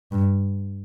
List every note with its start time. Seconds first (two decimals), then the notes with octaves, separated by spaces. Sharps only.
0.12 G2